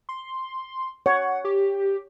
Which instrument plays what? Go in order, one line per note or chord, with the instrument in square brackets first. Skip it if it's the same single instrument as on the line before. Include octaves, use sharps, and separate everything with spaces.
[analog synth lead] C6
[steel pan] C#5 [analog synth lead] F#5
[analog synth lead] G4